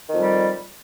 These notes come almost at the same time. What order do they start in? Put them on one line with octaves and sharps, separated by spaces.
D#3 F2 G3